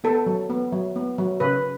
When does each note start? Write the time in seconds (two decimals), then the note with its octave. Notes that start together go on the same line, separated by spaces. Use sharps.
0.04 B3 A4
0.26 F#3
0.50 B3
0.72 F#3
0.96 B3
1.18 F#3
1.40 C#3 B4